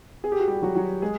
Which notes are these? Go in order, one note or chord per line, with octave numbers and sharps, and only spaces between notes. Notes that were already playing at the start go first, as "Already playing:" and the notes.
G#4
G4
F#4
G3 G4
F#3 F#4
F#3 F#4
G#3 G#4